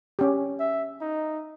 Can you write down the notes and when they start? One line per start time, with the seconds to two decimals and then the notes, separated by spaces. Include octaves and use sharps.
0.19 C#4 G4
0.60 E5
1.01 D#4